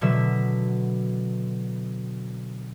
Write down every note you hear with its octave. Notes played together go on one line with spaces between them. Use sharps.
B2 D3 F#3 E5